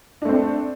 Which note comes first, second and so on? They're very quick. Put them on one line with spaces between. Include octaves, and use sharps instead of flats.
D4 A3 C4